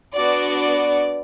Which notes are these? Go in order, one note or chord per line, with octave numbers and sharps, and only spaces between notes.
B3 D4 F#4 D5